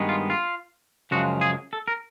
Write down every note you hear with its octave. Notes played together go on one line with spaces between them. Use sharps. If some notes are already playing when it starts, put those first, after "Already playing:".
Already playing: G2 D#3 G#3 B3
F4
F4
F#2 C#3 F3 G#3 F#4
G#4
A4
A#4